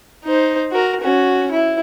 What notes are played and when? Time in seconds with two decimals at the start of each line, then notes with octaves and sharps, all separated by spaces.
0.24 D#4 C5
0.71 F#4 A#4
1.01 C#4 F#4
1.51 E4